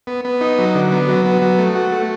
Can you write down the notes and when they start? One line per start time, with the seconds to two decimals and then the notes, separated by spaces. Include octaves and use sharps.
0.07 B3
0.25 B3
0.41 D#4
0.59 F#3
0.75 D3
0.92 B3
1.09 F#3
1.25 B3
1.42 F#3
1.58 A3
1.75 F#4
1.92 A3